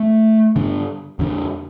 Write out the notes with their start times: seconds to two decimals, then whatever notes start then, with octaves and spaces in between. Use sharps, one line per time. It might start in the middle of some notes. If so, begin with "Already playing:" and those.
Already playing: A3
0.56 G2 D3
1.19 F2 D3